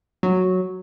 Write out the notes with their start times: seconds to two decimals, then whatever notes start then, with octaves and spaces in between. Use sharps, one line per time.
0.23 F#3